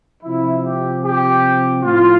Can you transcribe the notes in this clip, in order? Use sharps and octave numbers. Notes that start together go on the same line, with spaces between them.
C3 F3 E4
G4
G4
A2 F3 F4